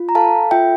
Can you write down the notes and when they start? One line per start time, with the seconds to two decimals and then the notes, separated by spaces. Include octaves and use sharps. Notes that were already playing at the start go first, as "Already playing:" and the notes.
Already playing: F4
0.09 A#5
0.15 A4 F5 A5
0.51 F4 E5 G5